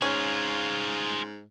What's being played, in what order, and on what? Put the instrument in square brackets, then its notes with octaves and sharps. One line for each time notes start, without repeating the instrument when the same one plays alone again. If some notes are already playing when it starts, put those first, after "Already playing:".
[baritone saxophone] G#2 [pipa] C#4 [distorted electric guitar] F4 G#4